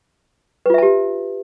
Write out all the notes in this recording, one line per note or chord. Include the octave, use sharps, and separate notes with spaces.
F4 G4 B4 E5 A5